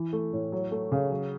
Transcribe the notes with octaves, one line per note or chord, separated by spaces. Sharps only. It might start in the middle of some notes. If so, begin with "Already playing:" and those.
Already playing: E3
A3
A2
F#3
A3
C#3
F#3